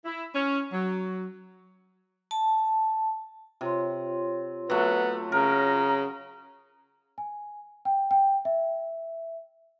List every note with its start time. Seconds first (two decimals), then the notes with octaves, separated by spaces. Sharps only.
0.04 E4
0.34 C#4
0.73 F#3
2.31 A5
3.61 C3 F4 C#5 C6
4.70 F#3 A3 B3
5.32 C#3 A#4 A#5
7.18 G#5
7.85 G5
8.11 G5
8.45 E5